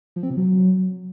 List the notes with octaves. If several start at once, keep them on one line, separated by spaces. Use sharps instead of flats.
F3
C4
C3
F#3